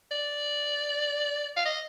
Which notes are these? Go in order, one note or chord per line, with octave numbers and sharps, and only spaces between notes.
D5
F5
D#5